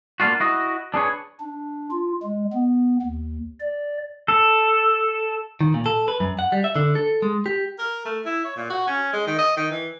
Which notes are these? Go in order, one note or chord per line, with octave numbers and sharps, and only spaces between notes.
A#3 D4 F4 F#4
E4 F#4 D#5
D4 G#4 B4 C#5
D4
F4
G#3
B3
D#2
D5
A4
D#3
A#2
A4
B4
F#2
F#5
G3
E5
D3
A4
G#3
G4
A#4
A3
E4
C#5
A#2
F#4
C#4
G#3
D#3
D#5
D#3
E3